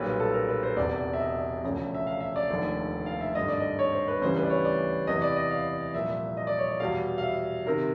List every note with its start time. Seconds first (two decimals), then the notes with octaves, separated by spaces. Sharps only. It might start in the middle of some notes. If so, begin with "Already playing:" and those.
Already playing: B1 A#2 G3 B4
0.20 A4
0.34 A#4
0.49 B4
0.63 C5
0.77 E1 E2 C3 D5
1.13 E5
1.20 D#5
1.63 E1 D2 C#3 F3
1.94 E5
2.07 F5
2.20 E5
2.36 D5
2.50 F1 D#2 D3 F3
3.06 F5
3.21 E5
3.35 G#1 G2 D3 D#5
3.48 D5
3.60 D#5
3.79 C#5
3.92 C5
4.08 B4
4.21 D2 C#3 E3 G3 C5
4.37 B4
4.43 D5
4.50 C#5
4.65 D5
5.07 E2 C3 E3 D#5
5.22 D5
5.36 D#5
5.50 F5
5.94 C2 A#2 F3 E5
6.37 D#5
6.47 D5
6.58 C#5
6.69 D5
6.79 E2 B2 G3 F5
7.18 F5
7.23 E5
7.66 C3 D#3 A#4